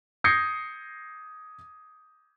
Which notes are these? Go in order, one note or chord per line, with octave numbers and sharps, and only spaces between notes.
D#6 G6 G#6 A#6 C7 C#7